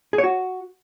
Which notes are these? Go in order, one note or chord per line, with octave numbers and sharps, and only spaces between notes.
G#4
C#5
F#4